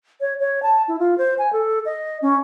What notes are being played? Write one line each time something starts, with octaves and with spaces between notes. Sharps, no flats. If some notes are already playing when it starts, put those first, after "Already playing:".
C#5
C#5
A5
E4
F4
C5
G#5
A4
D#5
C#4